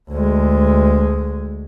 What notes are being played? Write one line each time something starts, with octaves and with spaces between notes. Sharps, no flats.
D2 G#3